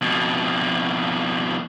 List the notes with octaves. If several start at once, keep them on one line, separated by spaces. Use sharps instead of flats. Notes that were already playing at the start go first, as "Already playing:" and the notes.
F2 B2